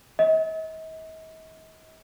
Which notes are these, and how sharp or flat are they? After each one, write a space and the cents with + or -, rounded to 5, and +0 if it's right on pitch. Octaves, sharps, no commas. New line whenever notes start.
D#5 +45